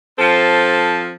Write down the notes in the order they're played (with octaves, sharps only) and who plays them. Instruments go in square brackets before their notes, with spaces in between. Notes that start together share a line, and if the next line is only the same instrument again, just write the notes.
[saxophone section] F3 C4 A4